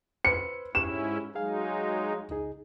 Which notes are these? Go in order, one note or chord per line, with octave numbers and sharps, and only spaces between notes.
B4 C5 C#7
G#2 C#4 E4 G4 C#6 E7
F#3 G#3 D#4 G#4 F5 G#5
C#2 D#4 G#4